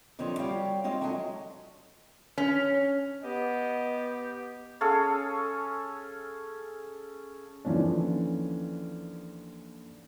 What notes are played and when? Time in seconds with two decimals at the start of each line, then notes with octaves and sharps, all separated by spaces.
0.19 F2 D3 F3 C4 C#5 D#5
0.39 G3 F#4 G4 C#5 F5 G5
0.84 G#3 C4 F4 C#5 D#5
1.01 F#3 D4 F#4 A4 D#5 G#5
2.38 C#4
3.22 B3 G4 D#5
4.81 C#4 G#4 A4 F5
7.65 D#2 D3 E3 F3 C#4 D4